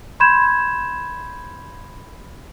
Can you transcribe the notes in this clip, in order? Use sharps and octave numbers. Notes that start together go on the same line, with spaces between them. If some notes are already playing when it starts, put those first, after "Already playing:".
B5 C6 G6 G#6 E7